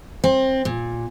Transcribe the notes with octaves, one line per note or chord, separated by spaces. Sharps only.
C4
A#2